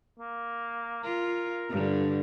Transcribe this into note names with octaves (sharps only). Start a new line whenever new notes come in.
A#3
F4 A#4
G2 D3